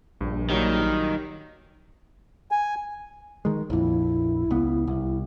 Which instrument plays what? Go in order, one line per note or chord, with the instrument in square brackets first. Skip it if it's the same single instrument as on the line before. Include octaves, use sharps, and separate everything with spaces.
[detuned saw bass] A#1 [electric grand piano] G2
[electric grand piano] A#2 F#3 G3 [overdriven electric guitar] D#3
[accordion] G#5
[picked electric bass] D#3 G#3
[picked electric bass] A#1 F2 [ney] E4
[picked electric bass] C#2 B3
C2